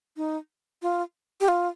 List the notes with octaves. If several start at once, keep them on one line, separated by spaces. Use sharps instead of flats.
D#4
F4
G4
F4